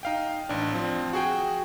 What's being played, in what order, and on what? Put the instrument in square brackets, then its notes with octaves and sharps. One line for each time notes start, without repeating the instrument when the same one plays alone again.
[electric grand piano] D#4 F5 G5
A1 D4
F3 C4
F#4 G#4 G5